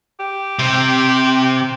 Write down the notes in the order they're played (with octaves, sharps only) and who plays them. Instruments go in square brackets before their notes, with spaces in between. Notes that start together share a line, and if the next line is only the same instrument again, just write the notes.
[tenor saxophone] G4
[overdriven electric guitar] C3